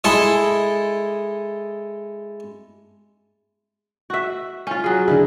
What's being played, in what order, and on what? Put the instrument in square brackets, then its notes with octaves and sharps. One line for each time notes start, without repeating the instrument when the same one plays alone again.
[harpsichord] G#3 E4 A4 D#5
[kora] F#4 E5
C#4 F4
F#3 G#4
[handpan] D3 D4 G#4 [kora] E4